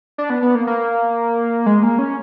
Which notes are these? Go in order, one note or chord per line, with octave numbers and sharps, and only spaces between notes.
D4
B3
B3
A#3
A#3
G#3
A#3
C#4